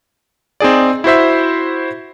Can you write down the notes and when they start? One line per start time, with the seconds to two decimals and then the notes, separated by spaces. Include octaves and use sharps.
0.60 C4 D#4 G#4 D5
1.04 E4 F#4 C5 E5